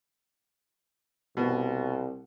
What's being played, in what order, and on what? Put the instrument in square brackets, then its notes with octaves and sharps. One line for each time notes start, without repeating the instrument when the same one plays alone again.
[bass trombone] C2 [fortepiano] B2